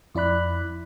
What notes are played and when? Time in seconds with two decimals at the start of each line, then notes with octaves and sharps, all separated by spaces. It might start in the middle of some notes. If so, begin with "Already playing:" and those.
0.15 F2 E4 D5 B5 F#6